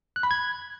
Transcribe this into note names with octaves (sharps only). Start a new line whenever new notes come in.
F#6
B5
G#6